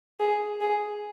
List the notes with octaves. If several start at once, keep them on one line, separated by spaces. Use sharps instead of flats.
G#4
G#4